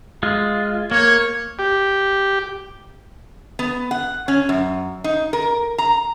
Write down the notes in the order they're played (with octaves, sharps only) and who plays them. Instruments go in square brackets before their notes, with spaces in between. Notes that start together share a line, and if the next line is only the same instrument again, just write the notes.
[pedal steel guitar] G#3 F4
[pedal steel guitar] A#3 [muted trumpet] C#5
[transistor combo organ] G4
[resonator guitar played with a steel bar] B3
F#5
C#4
F#2
D#4
A#4
A#5